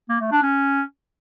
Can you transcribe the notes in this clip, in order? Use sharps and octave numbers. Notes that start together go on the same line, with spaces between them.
A#3
A3
D4
C#4